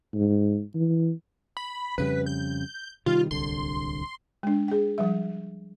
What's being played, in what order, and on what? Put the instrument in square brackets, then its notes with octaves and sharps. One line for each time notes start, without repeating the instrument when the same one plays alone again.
[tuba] G#2
E3
[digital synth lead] B5
[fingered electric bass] F2 C#3 G3 [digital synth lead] B4
[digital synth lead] G6
[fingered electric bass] C3 D#3 G3 [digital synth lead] F4
[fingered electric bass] D1 C2 D3 [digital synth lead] C6
[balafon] G#3 D4
G#4 G5
F3 G3 E5